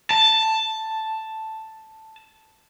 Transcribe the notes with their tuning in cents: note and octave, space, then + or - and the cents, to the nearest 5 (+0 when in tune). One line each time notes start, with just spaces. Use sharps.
A5 +5